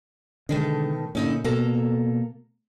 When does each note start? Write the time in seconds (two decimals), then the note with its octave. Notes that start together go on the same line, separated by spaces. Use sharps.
0.49 B2 D3 D#3 G#3 A3
1.15 A#2 D3 C#4 D#4 E4
1.44 B2 A#3 A4 A#5